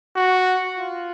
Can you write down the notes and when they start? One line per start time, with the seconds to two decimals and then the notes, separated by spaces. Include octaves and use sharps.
0.16 F#4
0.78 F4